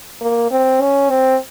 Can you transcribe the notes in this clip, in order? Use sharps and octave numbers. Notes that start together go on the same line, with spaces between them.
A#3
C4
C#4
C4